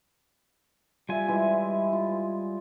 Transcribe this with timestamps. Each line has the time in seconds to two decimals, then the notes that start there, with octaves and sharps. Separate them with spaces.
1.09 G3 F4 E5 G#5
1.29 E3 G#3
1.93 F4